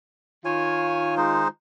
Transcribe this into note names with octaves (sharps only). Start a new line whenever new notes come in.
D#3 F4 C#5 G#5
G#3 D#4 C5